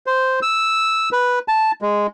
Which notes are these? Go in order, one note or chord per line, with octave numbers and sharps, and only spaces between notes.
C5
E6
B4
A5
G#3